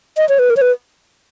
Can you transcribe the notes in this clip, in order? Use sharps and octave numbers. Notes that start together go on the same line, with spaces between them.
D#5
C#5
B4
A#4
C#5
B4